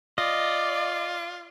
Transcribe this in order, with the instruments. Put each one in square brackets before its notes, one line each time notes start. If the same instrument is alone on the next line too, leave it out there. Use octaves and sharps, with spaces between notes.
[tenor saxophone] F4 [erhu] D5 [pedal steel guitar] D#5